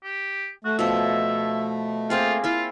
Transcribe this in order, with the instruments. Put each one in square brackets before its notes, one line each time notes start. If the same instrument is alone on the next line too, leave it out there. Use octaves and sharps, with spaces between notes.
[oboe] G4
[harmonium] A3 [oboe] F#4
[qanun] B2 F3 [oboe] E5
[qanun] A#3 C4 G#4 [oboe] F4
[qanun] E4 E5 [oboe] F4